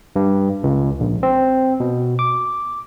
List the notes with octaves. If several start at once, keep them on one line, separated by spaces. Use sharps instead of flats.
G2
C#2
A#1
C4
B2
D6